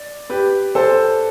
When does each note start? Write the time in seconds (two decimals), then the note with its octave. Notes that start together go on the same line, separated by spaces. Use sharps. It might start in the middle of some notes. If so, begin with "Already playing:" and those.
Already playing: D5
0.30 G4 B4
0.75 A4 C5